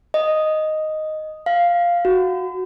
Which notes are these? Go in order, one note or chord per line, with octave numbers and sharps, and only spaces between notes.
D#5
F5
F#4